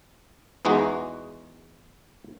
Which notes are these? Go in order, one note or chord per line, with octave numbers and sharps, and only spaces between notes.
E2 E3 G#3 D#4 F#4